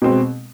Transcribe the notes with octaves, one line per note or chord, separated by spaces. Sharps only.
B2 G#3 C4